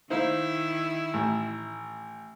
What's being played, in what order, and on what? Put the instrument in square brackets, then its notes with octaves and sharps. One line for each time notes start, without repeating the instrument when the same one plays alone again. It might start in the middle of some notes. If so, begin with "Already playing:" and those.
[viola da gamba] D#3 E4 [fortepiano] D#4 C5 F5
[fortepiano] A1